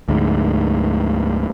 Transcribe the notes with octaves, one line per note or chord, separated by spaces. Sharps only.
D2 G#2